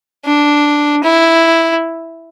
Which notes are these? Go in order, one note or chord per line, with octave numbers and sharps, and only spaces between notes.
D4
E4